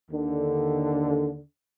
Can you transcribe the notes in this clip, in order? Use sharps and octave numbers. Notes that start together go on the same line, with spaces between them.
D#2 D3